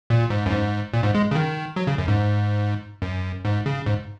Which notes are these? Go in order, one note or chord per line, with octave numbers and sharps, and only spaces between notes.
A#2
G#2
F#2
G#2
A#2
G#2
G#3
C#3
D#3
F#3
C#3
F#2
G#2
F#2
G#2
C#3
G#2